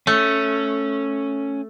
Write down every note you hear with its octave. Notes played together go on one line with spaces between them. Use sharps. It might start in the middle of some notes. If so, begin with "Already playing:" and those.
A3 C#4